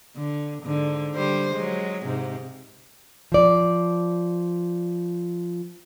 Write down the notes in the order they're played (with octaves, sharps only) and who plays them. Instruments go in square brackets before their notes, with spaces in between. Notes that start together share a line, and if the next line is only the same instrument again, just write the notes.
[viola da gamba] D3
G#2 D3
D3 G3 C5
F#3 G#3
G#2 C3
[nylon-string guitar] F3 D5